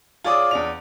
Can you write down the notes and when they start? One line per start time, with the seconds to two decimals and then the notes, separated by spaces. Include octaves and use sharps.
0.24 F4 G#4 C#5 D5 D6 D#6
0.51 E2 D4 F7